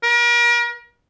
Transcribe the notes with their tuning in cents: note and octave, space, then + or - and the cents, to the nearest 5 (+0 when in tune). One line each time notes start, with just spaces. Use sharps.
A#4 +40